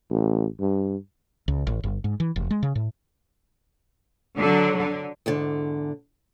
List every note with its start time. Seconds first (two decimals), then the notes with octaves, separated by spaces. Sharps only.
0.10 A1
0.60 G2
1.48 C#2
1.67 A1
1.84 G1
2.04 G#2
2.20 E3
2.36 F1
2.51 G#3
2.63 C#3
2.75 A2
4.37 D3 F#3
4.76 D3
5.26 E2 G#2 D3